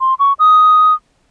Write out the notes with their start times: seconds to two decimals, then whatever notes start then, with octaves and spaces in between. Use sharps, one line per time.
0.01 C6
0.19 C#6
0.39 D#6